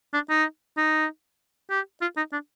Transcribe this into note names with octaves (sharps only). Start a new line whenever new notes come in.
D4
D#4
D#4
G4
F4
D#4
D4